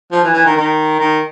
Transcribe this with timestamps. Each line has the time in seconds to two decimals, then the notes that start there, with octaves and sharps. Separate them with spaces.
0.12 F3
0.23 E3
0.34 E3
0.46 D#3
0.56 D#3
0.99 D#3